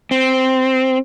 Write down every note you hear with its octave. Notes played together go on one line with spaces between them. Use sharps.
C4